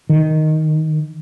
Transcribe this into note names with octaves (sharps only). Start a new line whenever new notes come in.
D#3